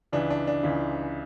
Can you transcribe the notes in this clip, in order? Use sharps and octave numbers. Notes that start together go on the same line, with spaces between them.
C#2 C#3 E3 D4
D4
D4
C#2 C#3 E3